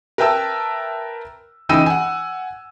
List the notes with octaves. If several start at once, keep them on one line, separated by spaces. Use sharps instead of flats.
A#4 B4 E5 G5 A5 E6
C#2 E3 D#4 G5 E6 D#7
F#5 G#5